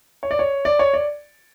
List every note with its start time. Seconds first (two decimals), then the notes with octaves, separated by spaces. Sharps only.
0.23 C#5
0.31 D5
0.39 C#5
0.65 D5
0.79 C#5
0.94 D5